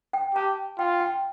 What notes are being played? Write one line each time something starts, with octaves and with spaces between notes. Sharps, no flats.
G5
G4 A5
F4 G5
G5